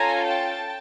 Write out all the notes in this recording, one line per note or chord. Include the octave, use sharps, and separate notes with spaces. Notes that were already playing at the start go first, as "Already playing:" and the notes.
Already playing: C#4 F4 A4 G#5 A#5
G5 A5